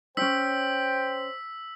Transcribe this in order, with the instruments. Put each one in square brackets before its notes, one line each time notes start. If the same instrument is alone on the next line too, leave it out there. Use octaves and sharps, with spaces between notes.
[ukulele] C#4 D4 [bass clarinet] C5 [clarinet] G5 [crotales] E6 B6